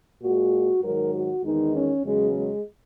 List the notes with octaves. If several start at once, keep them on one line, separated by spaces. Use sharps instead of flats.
A#2 G#3 F#4
G#2 D#3 F#3 A#4
F#4
E2 D#3 G#3 D#4
C#4
E2 C#3 F#3 G#3
G#3